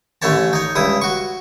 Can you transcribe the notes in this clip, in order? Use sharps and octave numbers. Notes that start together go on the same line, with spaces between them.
A1 D3 A3 C#4 C#5 A5
D#4 C#5
C#2 G2 E4 D#6
F#4 C#6